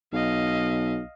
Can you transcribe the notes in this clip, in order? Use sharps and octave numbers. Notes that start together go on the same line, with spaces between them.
B1 D#5 F5